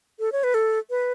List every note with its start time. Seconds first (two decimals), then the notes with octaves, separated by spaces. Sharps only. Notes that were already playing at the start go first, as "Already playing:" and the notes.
0.20 A4
0.32 C#5
0.44 B4
0.54 A4
0.90 B4